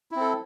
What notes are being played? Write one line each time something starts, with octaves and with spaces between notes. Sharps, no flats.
C4 E4 A4